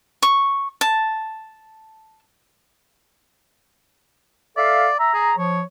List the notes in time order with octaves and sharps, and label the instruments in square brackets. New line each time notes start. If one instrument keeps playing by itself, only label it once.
[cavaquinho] C#6
A5
[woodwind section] A4 E5 F5 [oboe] D5
[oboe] E5 [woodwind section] A#5
[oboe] G#4
[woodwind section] F3 [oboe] C#5